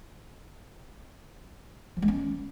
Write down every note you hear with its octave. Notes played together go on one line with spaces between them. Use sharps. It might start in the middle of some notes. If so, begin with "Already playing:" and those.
F3
G#3
C#4